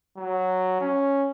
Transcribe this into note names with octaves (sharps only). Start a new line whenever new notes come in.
F#3
C#4